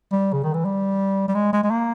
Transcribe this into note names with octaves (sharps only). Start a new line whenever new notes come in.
G3
C#3
D#3
E3
G3
G3
G#3
G#3
G#3
A#3